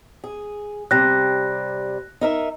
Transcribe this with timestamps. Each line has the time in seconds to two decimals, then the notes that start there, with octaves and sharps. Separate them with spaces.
0.24 G#4
0.91 C3 G3 F#6 A#6
2.21 D#4 A#4 E5